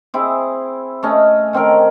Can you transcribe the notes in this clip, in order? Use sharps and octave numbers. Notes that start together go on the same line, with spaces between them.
C4 E4 G#4
A3 C#4 D#5
D#3 C4 C#4 A#4